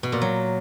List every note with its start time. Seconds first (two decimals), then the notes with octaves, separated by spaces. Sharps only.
0.03 B2
0.12 A#2
0.22 F#3